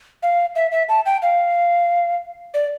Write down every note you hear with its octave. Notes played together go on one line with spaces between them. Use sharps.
F5
E5
E5
A5
G5
F5
D5